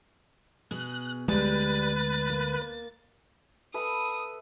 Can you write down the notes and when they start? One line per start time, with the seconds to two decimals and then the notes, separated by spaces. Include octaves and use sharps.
0.71 B2 G#4 F#6
1.28 D2 G3 G#3 B4 A6
2.30 A#3
3.74 A4 B4 E5 D#6